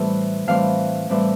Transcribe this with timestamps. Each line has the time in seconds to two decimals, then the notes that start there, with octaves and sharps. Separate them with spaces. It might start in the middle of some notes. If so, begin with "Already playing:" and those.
Already playing: A2 E3 G3 C4
0.47 A2 E3 G3 C4 F5
1.09 A2 E3 G3 C4